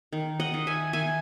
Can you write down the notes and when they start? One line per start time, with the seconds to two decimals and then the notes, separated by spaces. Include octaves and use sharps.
0.13 D#3
0.40 D#5 F#5
0.54 D#3
0.67 E5 G#5
0.93 D#3 E5 G#5